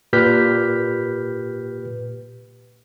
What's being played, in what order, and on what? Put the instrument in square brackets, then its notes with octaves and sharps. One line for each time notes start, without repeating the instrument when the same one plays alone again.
[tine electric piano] A#2 G4 B4 F6 G6 B6